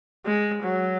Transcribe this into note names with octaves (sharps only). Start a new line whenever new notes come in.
G#3
F#3